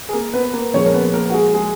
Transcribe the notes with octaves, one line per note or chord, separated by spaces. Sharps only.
G#4
A#3 A#4
B3 B4
A#3 A#4
A#2 F3 G#3 C#4 C#5
A#4
B3 B4
A#3 A#4
F#4
G#3 G#4
G#3 G#4